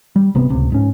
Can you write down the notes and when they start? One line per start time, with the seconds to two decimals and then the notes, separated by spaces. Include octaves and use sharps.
0.16 G3
0.35 G1 C3 B3
0.49 D1 C#2 C3
0.72 G#2 C#4